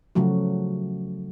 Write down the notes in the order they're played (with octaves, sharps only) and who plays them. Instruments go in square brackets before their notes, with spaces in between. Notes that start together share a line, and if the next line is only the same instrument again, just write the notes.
[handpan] C#3 F3 F#3 A3 F#4